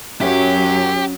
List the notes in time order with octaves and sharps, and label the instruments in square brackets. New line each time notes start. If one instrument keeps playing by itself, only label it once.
[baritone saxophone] F#2 [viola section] F#3 [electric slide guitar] C#4 E5 [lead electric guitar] G4